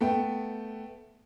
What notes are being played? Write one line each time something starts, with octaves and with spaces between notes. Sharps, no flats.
A3 B3 G5